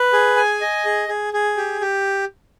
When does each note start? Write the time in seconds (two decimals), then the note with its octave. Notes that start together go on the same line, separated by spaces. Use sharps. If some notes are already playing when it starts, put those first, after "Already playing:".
Already playing: B4
0.13 G#4
0.37 G#5
0.61 D#5
0.85 G#4
1.09 G#4
1.34 G#4
1.57 G4
1.81 G4